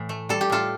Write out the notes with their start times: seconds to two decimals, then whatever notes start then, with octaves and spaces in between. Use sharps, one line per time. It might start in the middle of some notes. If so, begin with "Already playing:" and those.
Already playing: A2 E3
0.09 A3
0.29 G3 A4
0.41 G4
0.50 A2 F4 A4